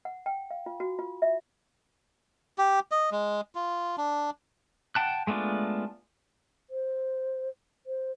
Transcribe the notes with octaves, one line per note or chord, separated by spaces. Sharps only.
F#5
G5
F5
F4
F#4
F4
E5
G4
D#5
G#3
F4
D4
F#5 G5 A5 F#6
G#3 A3 B3 D4 F4
C5
C5